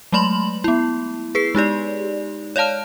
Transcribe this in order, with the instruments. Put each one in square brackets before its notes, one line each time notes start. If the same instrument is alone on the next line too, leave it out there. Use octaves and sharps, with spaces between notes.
[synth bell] F#3 G#3 A3 B5 C6 F#7
B3 E4
G#4 B4 C7
G#3 D#4 G4 D5
C#5 D5 F5 A5 F6